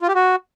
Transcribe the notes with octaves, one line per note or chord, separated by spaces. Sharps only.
F4
G4
F#4